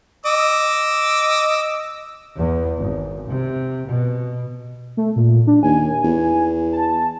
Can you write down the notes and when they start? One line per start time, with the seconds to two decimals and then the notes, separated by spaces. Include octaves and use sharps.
0.26 D#5 D6 E6
2.37 E2
2.80 G#1
3.29 C3
3.89 B2
4.97 A3
5.16 A#2
5.47 D4
5.63 D#2 G#5
6.04 E2
6.72 A5